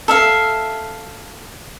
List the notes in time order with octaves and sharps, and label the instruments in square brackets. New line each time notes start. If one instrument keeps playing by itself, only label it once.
[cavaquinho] A4 E5 F5